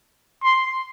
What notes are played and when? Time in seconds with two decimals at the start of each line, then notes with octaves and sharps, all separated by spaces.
0.43 C6